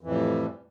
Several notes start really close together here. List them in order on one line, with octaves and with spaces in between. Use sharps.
F2 E3 A2 G3